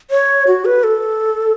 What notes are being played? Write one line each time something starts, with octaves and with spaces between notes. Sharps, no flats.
C#5
F#4
B4
A4